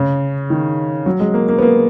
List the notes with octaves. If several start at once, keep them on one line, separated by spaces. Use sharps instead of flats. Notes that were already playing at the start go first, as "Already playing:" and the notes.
Already playing: C#3
D#3
F#3
G#3
A#3
A#3
B3
A#3